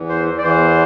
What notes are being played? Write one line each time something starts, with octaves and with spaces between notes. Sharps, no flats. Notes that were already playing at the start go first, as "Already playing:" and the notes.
Already playing: E2 E3
C5
D5
E2 E3 C5